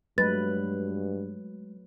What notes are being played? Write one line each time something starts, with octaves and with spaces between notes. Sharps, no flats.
G2 F#3 G#3 A3 B4 A6